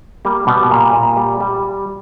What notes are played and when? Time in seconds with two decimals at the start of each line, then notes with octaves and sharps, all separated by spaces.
0.25 G3 A#3
0.47 B2 G3 B3
0.70 A#2 A#3
0.93 A#2
1.17 G3
1.41 G3